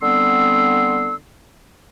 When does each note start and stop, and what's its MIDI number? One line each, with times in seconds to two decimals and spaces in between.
0.02 1.15 50
0.02 1.15 55
0.02 1.15 59
0.02 1.15 60
0.02 1.15 84
0.02 1.15 88